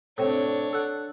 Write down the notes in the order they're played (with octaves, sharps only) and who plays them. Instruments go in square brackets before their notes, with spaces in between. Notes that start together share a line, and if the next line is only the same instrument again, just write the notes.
[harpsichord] A2 C3 [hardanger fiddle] D4 C#5
[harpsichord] A4 F#5